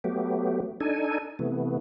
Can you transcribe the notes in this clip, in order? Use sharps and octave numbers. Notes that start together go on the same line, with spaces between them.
F#3 A3 B3 G4
D4 D#4 A4 G#5
C3 E3 A3 B3